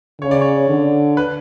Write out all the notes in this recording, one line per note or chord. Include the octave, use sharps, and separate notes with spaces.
C#3 C#5
D5
C#5
D3
B4